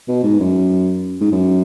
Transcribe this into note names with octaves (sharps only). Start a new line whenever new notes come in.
B2
G#2
F#2
G#2
F#2